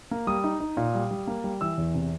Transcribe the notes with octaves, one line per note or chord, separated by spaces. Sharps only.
A#3
G3 D#6
D#4
D#4
A#2
G3
G3
A#3
G3
E3 E6
E2
C3